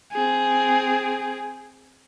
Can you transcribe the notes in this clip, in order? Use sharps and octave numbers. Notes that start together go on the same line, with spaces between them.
C4 G#4